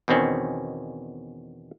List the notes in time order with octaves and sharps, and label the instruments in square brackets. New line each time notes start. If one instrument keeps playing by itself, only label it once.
[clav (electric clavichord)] E2 B2 D#3 C4 C#4